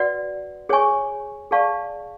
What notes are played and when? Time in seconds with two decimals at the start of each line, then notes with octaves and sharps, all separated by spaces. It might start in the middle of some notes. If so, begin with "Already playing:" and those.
Already playing: F#4 B4 D5 F#5
0.69 G#4 C#5 G#5 C#6
1.51 G#4 D5 F5 A5 C#6